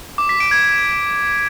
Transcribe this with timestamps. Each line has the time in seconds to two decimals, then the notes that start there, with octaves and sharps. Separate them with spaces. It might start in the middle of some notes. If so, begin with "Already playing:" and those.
0.18 D6
0.29 B6
0.40 D7
0.51 G#6